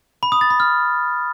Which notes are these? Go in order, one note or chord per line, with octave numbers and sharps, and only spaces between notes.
B5
D#6
A6
B5
F6